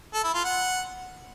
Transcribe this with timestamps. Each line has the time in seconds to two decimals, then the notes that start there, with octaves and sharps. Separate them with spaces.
0.14 A4
0.24 E4
0.34 F4
0.44 F#5